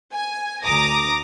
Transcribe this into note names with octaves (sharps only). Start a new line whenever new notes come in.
G#5
D2 A#5 D6 D#6 A#6